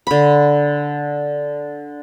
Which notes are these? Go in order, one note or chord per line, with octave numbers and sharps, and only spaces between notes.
D3 B5